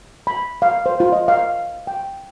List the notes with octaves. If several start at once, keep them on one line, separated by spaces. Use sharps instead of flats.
B5
F5
C5
F4
D#5
F5
G5